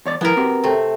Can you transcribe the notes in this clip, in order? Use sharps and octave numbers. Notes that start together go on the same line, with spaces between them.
E2 C#5 D5
F3 B3 E4 A#4 B4
C4 F#4 G4
C3 A3